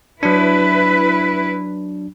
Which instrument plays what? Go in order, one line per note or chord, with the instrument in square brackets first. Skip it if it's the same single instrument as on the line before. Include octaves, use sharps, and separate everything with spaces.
[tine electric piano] F#3 D4 [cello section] E4 B4